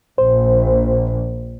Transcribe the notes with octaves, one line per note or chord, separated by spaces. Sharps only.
A#1 C5